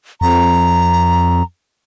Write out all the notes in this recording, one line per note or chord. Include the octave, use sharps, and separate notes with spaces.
F2 A#5